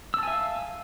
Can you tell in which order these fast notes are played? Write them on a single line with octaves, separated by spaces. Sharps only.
E6 A5 G#5 E5 F5